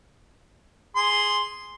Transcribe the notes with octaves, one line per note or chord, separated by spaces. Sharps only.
G#4 C6